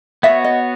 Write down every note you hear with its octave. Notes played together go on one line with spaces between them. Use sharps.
B3 F#4 C#5 E5
D#5